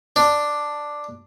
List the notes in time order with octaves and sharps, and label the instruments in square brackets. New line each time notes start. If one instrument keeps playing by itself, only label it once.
[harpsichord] D4